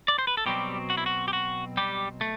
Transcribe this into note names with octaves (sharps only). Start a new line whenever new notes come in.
D5
C5
B4
A4
B2 F#3 G3 C4 G4
F#4
E4
F#4
G4
F#4
G3 G4
A3